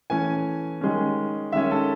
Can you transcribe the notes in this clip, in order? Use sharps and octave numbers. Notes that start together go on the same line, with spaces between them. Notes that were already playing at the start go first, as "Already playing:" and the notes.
E3 A3 C#4 G#5
D#3 G#3 C#4
D#3 G#3 C#4 E5
A4